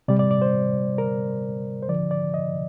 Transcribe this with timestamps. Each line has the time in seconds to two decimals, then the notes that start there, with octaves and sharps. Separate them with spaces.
0.08 C3 G3 D5
0.19 D5
0.31 D5
0.42 C5
0.98 A#4
1.83 C5
1.88 D3 F3 D5
2.11 D5
2.34 D#5